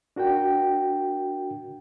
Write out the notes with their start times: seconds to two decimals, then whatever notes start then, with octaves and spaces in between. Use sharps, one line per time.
0.16 D4 F#4 A#4 G5